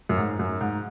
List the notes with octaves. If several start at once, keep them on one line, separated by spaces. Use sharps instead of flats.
F#2
G#2
F#2
G#2